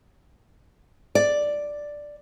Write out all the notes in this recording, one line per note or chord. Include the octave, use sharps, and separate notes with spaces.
D5